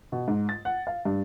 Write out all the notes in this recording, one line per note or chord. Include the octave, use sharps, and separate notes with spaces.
B2
G#2
A6
F#5
F5
G2